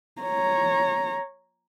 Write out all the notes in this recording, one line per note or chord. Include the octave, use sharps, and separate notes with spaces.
C#5 A#5